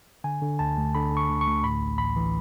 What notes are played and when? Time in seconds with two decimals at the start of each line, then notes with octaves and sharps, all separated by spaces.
0.24 D3 G#5
0.42 D3
0.59 D2 A5
0.77 D2
0.95 D3 B5
1.12 D3
1.17 C#6
1.30 D2
1.41 C#6
1.47 D2
1.63 A2 B5
1.81 A1
1.98 A1 B5
2.16 E3